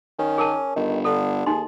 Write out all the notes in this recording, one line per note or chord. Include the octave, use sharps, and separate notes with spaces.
D#3 C#4
G#4 A#4 A5
G1 D#3
D3 A4
D#2 D#4 G#4 D#5 C6